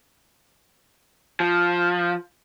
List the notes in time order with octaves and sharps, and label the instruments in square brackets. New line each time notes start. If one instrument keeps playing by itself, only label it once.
[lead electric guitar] F3